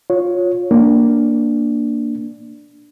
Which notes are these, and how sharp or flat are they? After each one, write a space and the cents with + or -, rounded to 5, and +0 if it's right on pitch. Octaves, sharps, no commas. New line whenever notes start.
F4 +20 C#5 +0
A#3 +0 D4 +0